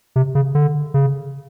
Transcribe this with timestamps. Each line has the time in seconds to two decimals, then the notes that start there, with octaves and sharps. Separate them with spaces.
0.16 C3
0.35 C#3
0.55 D3
0.94 C#3